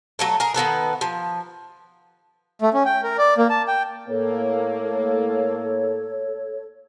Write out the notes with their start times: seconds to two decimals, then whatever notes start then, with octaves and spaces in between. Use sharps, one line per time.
0.19 F#3 A3 A4
0.40 G#4 A#4
0.54 D#3 B3 A4 B4
1.01 F3
2.62 A3
2.74 C#4
2.86 G5
3.03 A#4
3.18 D5
3.37 A#3
3.50 A5
3.68 G5
4.08 A2 A#3 A4 C#5